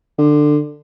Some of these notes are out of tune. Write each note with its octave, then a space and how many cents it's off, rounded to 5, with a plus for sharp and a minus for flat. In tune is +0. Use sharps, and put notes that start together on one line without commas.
D3 +20